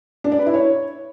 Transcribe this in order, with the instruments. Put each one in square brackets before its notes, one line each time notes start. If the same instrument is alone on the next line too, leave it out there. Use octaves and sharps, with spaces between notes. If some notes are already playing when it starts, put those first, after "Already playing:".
[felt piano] D4
D5
B4
E4
C#5